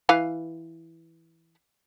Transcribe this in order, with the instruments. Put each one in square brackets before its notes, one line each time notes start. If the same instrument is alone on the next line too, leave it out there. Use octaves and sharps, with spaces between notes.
[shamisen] E3 B4 F5